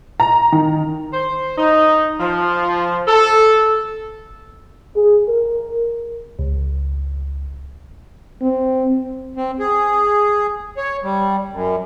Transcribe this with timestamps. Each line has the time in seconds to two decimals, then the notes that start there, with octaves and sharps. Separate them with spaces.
0.20 A#5
0.52 D#3
1.14 C5
1.57 D#4
2.20 F3
3.07 A4
4.96 G#4
5.28 A#4
6.39 C#2
8.42 C4
9.37 C4
9.60 G#4
10.77 C#5
11.04 G3
11.53 F#2